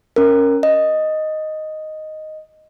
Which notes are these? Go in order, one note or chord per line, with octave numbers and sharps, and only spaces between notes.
C#4 A#4
D#5